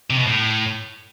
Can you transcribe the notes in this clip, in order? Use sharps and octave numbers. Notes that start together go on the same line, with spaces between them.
C3
B2
A2